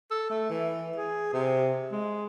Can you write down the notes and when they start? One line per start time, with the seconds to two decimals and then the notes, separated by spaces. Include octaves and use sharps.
0.11 A4
0.30 A3
0.50 E3
0.96 G#4
1.33 C3
1.92 G#3